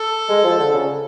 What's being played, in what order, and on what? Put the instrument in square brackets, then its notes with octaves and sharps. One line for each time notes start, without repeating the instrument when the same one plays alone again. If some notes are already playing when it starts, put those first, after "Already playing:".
Already playing: [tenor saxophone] A4
[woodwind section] G#3
F3
D3
C#3